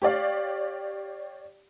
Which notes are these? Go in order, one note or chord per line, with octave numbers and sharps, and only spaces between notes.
G4 C#5 D5 F5